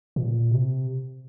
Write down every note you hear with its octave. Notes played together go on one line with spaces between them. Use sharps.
A#2
C3